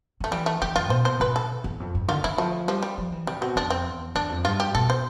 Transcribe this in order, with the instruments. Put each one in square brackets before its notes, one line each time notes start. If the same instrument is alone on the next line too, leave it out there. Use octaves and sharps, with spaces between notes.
[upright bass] D3 [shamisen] A3
[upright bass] E3 [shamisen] G3
[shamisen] A3
[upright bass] E3 [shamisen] G4
[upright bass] F2 [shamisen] F4
[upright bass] B2 [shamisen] C5
[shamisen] C5
[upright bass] B2 [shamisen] B4
[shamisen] A4
[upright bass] E2
F2
G2
[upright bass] D3 [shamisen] F4
[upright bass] D3 [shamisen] E4
[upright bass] F3 [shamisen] A3
[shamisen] F3 [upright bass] G3
[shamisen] G3
[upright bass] F3
E3
[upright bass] C3 [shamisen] G3
[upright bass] A2
[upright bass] B2 [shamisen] C4
[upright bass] F2 [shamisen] D4
[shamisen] C4
[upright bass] E2
[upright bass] E2 [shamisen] D4
[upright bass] F2
[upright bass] G2 [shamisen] F4
[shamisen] G4
[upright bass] B2 [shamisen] A4
[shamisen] C5